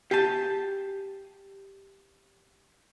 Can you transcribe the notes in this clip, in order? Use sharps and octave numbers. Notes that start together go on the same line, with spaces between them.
G4 F5 G#5 A5